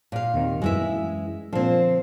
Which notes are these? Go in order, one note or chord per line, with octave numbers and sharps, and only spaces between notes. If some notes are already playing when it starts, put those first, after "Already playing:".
A#2 F5
D#2 C3 D#3
F#2 E3 G#3 E4 E5
A#2 D3 F3 C4